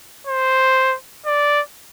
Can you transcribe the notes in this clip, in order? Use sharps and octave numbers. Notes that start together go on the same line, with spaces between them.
C5
D5